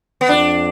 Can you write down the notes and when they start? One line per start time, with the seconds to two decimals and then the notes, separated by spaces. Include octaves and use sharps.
0.21 B3
0.29 F2 D4